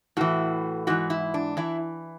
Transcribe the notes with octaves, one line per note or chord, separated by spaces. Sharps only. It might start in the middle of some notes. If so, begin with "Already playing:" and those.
A2 E3 F#4
G#2 E3 F#4
E4
D4
E3 E4